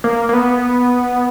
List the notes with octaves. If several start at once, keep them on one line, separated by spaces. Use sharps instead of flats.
A#3
A#3
B3